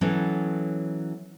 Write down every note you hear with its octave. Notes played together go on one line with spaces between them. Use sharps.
E3 F#3 B3 C#4 A4